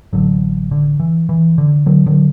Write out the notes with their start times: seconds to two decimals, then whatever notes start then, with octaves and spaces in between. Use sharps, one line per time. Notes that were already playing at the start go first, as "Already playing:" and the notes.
0.13 A1 A2 D3 F#3
0.71 D3
1.00 E3
1.29 E3
1.58 D3
1.86 D3 F#3
2.06 D3 F#3